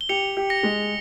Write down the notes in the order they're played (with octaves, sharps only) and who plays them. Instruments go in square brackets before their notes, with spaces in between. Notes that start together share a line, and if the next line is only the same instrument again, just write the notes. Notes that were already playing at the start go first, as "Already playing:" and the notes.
[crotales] G7
[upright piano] G4 [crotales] C#7 F7
[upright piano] G4
[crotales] A#6 C#7
[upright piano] G#3